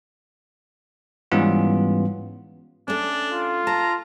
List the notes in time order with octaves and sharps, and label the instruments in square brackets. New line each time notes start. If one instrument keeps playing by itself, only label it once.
[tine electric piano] G#2 E3 G3 B3 C#4 F4
[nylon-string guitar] A3 C#4 [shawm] D4
[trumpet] F4
[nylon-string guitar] A5 [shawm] A#5